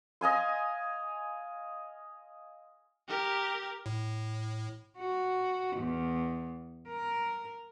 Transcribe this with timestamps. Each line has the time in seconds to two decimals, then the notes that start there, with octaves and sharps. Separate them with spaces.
0.21 D#5 F5 G#5 C6
3.08 G4 A#4
3.86 A2
4.98 F#4
5.77 E2
6.89 A#4